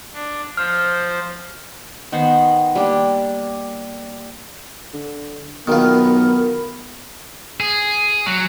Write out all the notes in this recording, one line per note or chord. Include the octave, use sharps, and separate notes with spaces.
D4
F3 C5 F6
D#3 B3 C5 F#5
G3 A#3 D4
D3
B1 D#3 B3 F4 A#4
G#4
F#3